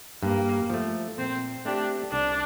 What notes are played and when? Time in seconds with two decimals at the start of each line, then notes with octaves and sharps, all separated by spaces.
0.23 G2 A#3
0.70 F3 A3
1.18 A#2 C4
1.65 A3 C4 D4 G4
2.12 C2 D4